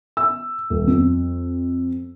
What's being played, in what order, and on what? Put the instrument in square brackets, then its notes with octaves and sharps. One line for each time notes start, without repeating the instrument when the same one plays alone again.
[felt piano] E6
D#1
F2